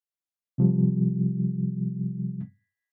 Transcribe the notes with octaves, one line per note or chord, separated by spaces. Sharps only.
C3 F3 G3